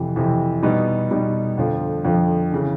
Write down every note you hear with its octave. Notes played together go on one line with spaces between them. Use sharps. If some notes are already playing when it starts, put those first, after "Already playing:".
Already playing: F2 C3 E3
F2 C3 E3
B2 G3 B3 D#4
B2 G3 B3 D#4
F2 D3 F3
F2 D3 F3
C#3 E3